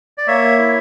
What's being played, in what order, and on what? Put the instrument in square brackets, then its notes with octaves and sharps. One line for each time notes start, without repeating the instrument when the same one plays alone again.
[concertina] D5
A#3 C#5 E5
E4